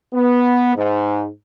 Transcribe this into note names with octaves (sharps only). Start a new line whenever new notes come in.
B3
G#2